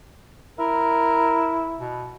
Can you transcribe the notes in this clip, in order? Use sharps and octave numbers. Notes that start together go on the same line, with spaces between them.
E4 A#4
B2